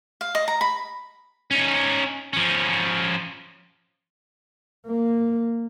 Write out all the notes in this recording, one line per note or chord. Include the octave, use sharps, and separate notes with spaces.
F5
D#5
A#5
B5
C#4 D#4
F3 C#4
A#3